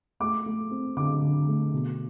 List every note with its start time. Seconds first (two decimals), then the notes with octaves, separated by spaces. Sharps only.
0.20 A3 D6
0.46 A3
0.71 C4
0.97 D3 D6
1.22 D3
1.47 A3
1.73 B2